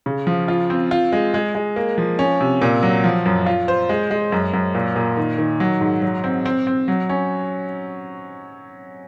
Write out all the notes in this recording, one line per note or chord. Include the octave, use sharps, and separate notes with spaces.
C#3
F3
F4
C4
F4
G#3
G#3
G#3
A#3
F3
C#4
C3
A#2
F#3
F3
F#2
F4
C5
G#3
G#3
F#2
F#2
A#2
A#2
D#3
D#3
F#3
G#2
F#3
C4
C4
C4
F#3
C#4